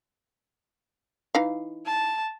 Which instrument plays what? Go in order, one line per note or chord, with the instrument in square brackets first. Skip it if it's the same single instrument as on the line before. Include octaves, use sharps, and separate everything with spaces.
[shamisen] E3 D#4 F5
[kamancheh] A5